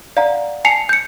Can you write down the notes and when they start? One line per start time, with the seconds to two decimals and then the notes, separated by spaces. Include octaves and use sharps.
0.17 D5 F5 F#5 A#5
0.65 G#5 A5 C7 C#7 F7
0.89 G6 C#7